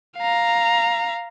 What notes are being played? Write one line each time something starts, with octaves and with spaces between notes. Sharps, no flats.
F5 A#5